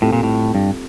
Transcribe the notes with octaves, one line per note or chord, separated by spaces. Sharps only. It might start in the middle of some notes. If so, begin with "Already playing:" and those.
A2 G3 C4 F4 A4
A#2
A2
G2